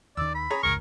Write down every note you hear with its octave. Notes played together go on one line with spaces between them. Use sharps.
D#2 D#3 D5 E6
B5
G#4 C#5 A#5
F1 C#2 G#2 A#4 C#6